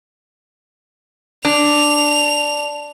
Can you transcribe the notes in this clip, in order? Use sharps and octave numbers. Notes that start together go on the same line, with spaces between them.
D4 F7